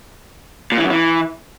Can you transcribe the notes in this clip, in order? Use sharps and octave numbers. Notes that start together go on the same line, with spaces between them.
A#2
E3
F#2
E3